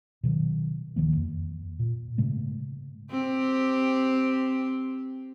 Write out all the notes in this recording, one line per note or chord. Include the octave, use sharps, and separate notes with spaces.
B2 D#3 F#3
D1 D#3 F3 A#3
F2
A#2
G#2 C#3 G#3 A3
C4 G4